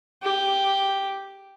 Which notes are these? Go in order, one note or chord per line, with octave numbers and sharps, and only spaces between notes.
G4